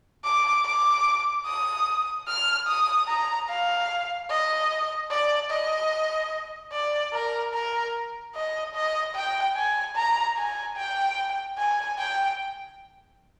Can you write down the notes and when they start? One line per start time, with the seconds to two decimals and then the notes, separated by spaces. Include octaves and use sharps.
0.25 D6
0.65 D6
1.46 D#6
2.28 F6
2.68 D#6
3.08 A#5
3.50 F5
4.30 D#5
5.11 D5
5.51 D#5
6.73 D5
7.13 A#4
7.54 A#4
8.35 D#5
8.75 D#5
9.16 G5
9.56 G#5
9.96 A#5
10.37 G#5
10.77 G5
11.58 G#5
11.98 G5